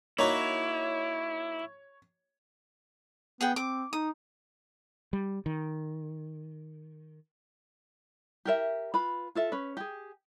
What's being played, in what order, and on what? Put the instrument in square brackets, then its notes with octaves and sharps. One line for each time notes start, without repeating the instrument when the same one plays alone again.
[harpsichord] A#3 D#4 F#4 [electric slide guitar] E4 [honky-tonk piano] C#5
[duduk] B3 [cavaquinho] G#4 F#5 G5
[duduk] C4 [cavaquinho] D6
[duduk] D#4 [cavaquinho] D#6
[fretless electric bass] G3
D#3
[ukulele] G4 A#4 E5
F4 B4 B5
F4 A4 E5
C#4 B4
G4 G#4